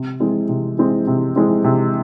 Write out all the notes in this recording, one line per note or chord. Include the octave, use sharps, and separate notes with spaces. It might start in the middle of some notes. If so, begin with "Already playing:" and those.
Already playing: C3
E3 G#3 C4
C3
E3 G#3 C4
C3
E3 G#3 C4
C3